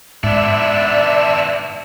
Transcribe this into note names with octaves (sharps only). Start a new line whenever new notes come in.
G#2 B3 D4 D5 E5